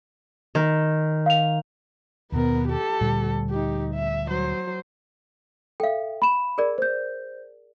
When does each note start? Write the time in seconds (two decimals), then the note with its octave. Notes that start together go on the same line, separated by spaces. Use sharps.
0.55 D#3
1.26 F5 F7
2.32 D#2 B2 B3 A#4
2.68 G4 A4
3.01 D2 A#2 G3
3.50 D#4 G4
3.95 E5
4.27 F#3 C5
5.80 A4 E5 F5 G5
6.22 B5 E7
6.58 G#4 A#4 D5
6.78 C5 G6